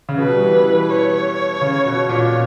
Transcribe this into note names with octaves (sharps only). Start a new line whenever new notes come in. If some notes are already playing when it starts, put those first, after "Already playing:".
C#3
B2 B4
G3
E3
E3
C#5
C#3
B2
A#2